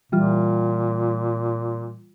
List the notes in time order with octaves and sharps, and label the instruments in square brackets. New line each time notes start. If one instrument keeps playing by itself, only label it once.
[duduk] A#2 [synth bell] E3 G3 F4